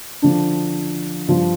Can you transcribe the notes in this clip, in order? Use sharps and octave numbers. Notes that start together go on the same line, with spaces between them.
D3 F3 D4
G2 F3 D4 F4